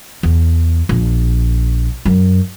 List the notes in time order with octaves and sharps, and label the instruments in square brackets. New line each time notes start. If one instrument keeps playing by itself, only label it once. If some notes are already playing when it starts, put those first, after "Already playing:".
[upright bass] E2
A#1
F#2